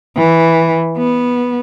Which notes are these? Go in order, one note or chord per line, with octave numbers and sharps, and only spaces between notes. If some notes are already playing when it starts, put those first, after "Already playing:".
E3
B3